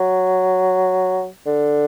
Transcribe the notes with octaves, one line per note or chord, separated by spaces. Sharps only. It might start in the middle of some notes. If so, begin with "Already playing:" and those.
Already playing: F#3
D3